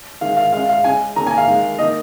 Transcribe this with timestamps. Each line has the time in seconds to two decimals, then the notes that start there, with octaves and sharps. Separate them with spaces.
0.21 D#3 G#3 F5
0.37 F5
0.53 C#3 G#3 F5
0.69 F5
0.84 C#3 G#3 G#5
1.16 D#3 A#3 A#5
1.27 G#5
1.37 F5
1.48 D#3 G#3
1.78 D#3 A#3 D#5